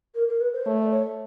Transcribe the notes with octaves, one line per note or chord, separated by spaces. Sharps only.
A#4
A#4
B4
C5
A3 C#5
D5
C#5